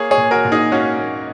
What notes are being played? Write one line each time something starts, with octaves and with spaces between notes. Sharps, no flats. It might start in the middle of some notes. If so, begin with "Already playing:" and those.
Already playing: A#3 G#4 C#5
G#4 C#5
A#2
F#4 A#4
A#2
D#4 G#4
A#3 C#4 F#4
A#3